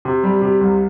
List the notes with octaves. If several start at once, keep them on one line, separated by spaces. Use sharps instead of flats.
C3
G3
C3
C2